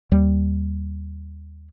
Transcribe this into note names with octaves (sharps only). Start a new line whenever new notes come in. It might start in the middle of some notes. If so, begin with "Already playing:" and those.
D#2 G3